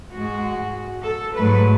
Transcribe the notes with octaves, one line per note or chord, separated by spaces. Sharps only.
G#2 G#3 F#4
A4
G#2 F#3 A3 B4